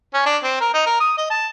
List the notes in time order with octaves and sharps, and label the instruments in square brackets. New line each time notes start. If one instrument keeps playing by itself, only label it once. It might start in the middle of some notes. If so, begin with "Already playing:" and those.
[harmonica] C#4
D4
C4
A#4
D#4
A#4
D#6
D#5
A5